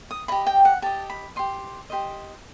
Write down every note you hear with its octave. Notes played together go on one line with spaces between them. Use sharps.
D#6
G4 D#5 B5
G5
F#5
G4 D#5 A5
B5
G4 C5 D#5 C6
G4 C5 D#5